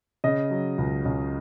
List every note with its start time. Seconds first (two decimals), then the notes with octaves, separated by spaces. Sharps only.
0.24 C#3 D#5
0.51 F#3
0.78 C#2
1.05 C#2